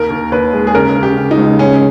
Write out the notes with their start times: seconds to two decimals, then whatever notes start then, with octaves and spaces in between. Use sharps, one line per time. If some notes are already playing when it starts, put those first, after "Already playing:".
Already playing: D#2 A#4
0.10 D#2
0.32 D#2 B4
0.53 G#3
0.67 G#4
0.74 C#3 A#4
0.95 C#3
1.03 G4
1.17 C#3
1.31 D#4
1.38 C#2
1.59 C#4 G#4